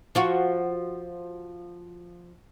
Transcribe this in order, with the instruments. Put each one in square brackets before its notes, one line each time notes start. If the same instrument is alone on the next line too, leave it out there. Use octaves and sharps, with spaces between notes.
[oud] F3 F4 F#4